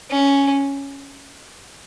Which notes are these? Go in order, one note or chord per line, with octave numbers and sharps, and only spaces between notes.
C#4